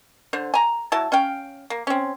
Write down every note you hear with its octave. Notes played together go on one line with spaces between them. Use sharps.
D3 C5
G#5 A#5
F#3 E4 A5
C#4 F5 G5
A#3
C4 C#4